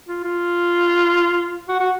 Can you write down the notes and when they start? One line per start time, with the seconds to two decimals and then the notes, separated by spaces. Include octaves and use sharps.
0.08 F4
0.24 F4
1.68 F#4
1.79 F#4